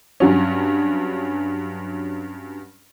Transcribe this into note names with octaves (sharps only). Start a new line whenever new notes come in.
G2 F#3 C#4